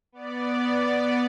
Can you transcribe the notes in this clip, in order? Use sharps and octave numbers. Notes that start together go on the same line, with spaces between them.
B3 D5